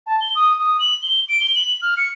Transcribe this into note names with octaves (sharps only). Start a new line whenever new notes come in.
A5
G7
D#6
D#6
F#7
G7
D7
G7
F#7
F6
C#7